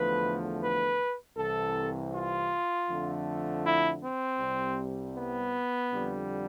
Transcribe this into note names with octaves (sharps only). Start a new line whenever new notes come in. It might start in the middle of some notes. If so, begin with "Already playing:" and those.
Already playing: E2 D3 F3 A3 B4
B4
C2 C3 E3 A4
F4
F2 D3 F3 A3
E4
C4
C2 C3 G3
B3
F2 D3 G3